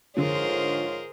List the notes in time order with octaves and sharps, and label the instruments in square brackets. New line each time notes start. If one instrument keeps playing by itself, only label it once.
[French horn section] G#2 C#5 [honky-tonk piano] D3 F3 [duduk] F4 [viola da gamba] G#4 A#4 C5